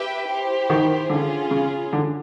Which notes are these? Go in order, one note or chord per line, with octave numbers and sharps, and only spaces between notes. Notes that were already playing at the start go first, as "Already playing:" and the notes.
Already playing: G4 B4 E5 G5
E4 G4 C5
D#3
D3 C#4 F4 G#4
C#3
D3